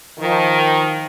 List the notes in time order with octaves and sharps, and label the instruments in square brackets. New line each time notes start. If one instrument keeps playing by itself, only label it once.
[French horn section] D#3 [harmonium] F3